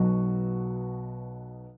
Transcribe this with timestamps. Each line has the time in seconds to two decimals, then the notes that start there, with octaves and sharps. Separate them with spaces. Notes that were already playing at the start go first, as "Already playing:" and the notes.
Already playing: B1 B2 F#3 F#4